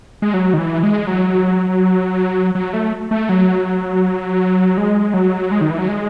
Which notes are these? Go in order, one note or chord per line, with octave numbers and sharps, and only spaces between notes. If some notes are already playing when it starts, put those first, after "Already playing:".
G#3
F#3
D#3
E3
G#3
F#3
F#3
A3
A3
F#3
G#3
F#3
G#3
D#3
E3
F#3
G#3